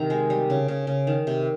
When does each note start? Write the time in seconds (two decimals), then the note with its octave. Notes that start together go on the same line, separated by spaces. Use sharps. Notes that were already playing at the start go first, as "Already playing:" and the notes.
Already playing: C3 D#3 A#5
0.10 G#3
0.30 G3
0.50 C#3
0.68 C#3
0.87 C#3
1.07 D#3
1.27 C3